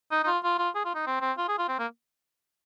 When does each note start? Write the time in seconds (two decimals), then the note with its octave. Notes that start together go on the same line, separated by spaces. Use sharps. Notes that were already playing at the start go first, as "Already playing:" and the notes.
0.11 D#4
0.24 D#4
0.27 F4
0.43 F4
0.58 F4
0.75 G#4
0.85 F4
0.95 D#4
1.06 C4
1.21 C4
1.38 F4
1.48 G#4
1.58 F4
1.68 C4
1.79 A#3